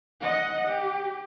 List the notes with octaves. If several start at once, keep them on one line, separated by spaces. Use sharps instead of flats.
D#5 F#5
G4